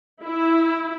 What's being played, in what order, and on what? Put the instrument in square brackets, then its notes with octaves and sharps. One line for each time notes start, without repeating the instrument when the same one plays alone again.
[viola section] E4